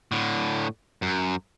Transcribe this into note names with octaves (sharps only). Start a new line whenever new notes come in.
A2 D3
F#2